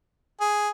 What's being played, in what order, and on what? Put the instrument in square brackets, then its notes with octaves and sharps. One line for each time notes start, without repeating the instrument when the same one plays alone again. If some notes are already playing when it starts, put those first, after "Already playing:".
[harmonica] G#4